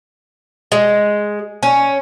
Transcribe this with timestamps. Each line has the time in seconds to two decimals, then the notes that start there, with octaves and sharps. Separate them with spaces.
0.72 G#3
1.63 C#4